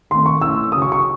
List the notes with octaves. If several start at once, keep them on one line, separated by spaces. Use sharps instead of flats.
D#3 A3 C4 C6
C#6
E3 A3 C#4 E6
C#3 F#3 A3 C#4 D#6
C#6
C#6